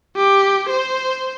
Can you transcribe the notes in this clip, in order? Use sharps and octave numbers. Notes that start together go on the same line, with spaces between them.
G4
C5